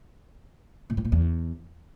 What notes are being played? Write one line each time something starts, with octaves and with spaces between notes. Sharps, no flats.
A#2
A2
A#2
E2